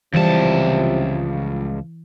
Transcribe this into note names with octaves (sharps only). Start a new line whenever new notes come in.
C#2 C3 E3 F3 G3 A5